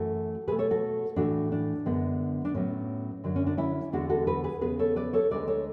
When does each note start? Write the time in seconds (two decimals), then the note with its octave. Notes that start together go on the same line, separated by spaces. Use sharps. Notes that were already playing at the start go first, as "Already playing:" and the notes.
Already playing: F#2 E3 A3 F#4 A4
0.48 B2 A3 G#4 B4
0.59 A4 C#5
0.70 F#4 A4
1.16 A2 E3 A3 D4 F#4
1.52 D4
1.86 F#2 D3 G#3 B3
2.45 D4
2.54 A2 F#3 B3 C#4
3.24 F#2 D3 F#3
3.36 C#4
3.47 D4
3.57 C#4 E4
3.92 E2 D3 G#3 B3 D4 F#4
4.09 F#4 A4
4.27 G#4 B4
4.44 G#4 B4
4.61 E2 C#3 E3 B3 G#4 B4
4.79 A4 C#5
4.96 B4 D5
5.13 A4 C#5
5.31 D2 D3 G#3 B4 D5
5.47 A4 C#5